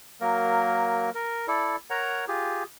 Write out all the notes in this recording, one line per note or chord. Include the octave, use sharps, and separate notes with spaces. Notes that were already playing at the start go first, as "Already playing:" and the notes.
F#3 A#3 A#4
A#4
E4 A4 D5
A#4 C#5 F#5 A#5
F4 G4 G#4